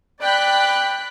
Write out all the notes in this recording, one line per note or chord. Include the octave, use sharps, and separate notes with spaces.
D5 G5 B5 F#6 B6